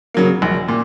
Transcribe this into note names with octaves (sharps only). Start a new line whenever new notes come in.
C#3 F#3 A#3
A#1
A#2